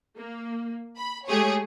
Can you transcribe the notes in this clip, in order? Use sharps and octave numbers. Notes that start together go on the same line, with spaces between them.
A#3
B5
G#3 A3 G4 G#4 C#5